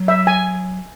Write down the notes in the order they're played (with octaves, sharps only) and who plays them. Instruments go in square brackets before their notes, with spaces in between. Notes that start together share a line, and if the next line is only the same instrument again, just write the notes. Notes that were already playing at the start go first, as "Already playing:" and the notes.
Already playing: [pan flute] F#3
[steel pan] E5
G#5